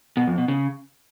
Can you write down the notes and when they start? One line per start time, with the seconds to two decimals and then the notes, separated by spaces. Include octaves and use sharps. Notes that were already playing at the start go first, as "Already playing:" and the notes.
0.17 B2
0.27 F2
0.38 B2
0.48 C#3